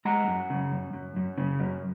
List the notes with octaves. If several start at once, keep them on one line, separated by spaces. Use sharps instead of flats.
G#3 F#5 A#5
F#2
C#3
F#2
F#2
F#2
C#3
F#2